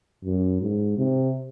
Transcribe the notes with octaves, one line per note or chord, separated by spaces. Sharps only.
F#2
G#2
C3